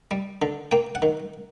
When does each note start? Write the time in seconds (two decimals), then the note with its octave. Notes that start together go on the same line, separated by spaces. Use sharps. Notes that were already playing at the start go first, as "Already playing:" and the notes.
0.11 G3
0.42 D3
0.72 A#3 G5
0.95 F#5
1.02 D#3